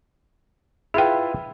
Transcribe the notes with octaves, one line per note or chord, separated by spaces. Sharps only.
E4 F4 G#4 B4 G5